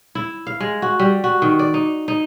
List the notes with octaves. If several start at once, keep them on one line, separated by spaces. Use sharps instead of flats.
E4
F5
G#3
F#4
G3
F#4
D#3
D5
D#4
D#4